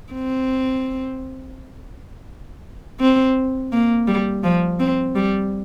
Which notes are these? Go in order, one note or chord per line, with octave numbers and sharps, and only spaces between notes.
C4
C4
A#3
G3
F3
C4
G3